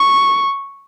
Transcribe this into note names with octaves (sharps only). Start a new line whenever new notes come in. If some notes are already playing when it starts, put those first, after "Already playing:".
Already playing: C#6